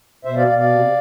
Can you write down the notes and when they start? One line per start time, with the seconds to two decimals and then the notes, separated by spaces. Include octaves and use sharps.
0.25 B2 C5 E5
0.36 D5 F5
0.47 B2 D5 F5
0.58 D5 F5
0.70 C3